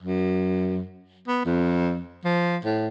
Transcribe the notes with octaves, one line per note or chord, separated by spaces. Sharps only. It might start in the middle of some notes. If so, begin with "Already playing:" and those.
F#2
B3
F2
F3
A2